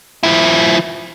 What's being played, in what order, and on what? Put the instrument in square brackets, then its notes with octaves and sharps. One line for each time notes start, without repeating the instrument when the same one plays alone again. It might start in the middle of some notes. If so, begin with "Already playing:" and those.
[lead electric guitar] F3 E4